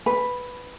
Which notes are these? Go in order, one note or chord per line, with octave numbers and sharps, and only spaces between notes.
B4